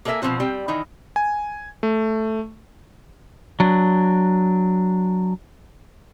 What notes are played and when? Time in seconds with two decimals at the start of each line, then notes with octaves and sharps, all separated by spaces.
0.05 A#3 A4 A#4 D5 E5 G#5
0.22 B2 F3 G#3 C4 F#4
0.40 G3 C4 G5
0.68 D#3 E3 D#4
1.16 G#5
1.83 A3
3.60 F#3 D4